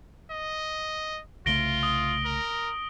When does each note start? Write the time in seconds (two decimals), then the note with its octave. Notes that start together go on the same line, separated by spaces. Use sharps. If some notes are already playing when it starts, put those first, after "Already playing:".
0.31 D#5
1.46 C2 C#3 A3 F4 A#6 D7 G7
1.83 D#6 G7
2.25 A#4